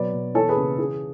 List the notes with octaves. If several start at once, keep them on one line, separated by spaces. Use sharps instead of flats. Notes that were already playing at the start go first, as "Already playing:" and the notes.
Already playing: B2 F#3 B4 D5
B2
E3 A4 C#5
G#4 B4
C#3
E3 G#4